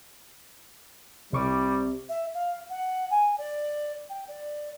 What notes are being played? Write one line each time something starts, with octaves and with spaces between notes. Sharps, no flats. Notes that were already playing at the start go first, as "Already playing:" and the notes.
C2 C3 G3 C#6 D6
E5
F5
F#5
G#5
D5
G5
D5